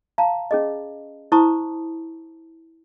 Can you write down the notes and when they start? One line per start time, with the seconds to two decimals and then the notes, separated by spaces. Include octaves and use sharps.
0.18 F5 A5 A#5
0.51 C#4 G#4 D#5
1.32 E4 C5 A5 A#5 C#6 D#6